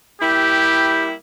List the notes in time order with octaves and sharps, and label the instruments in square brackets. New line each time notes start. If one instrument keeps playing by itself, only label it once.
[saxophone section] G3 A#3 E4 [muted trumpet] G4